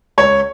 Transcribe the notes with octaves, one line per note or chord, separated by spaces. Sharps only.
C#2 C#5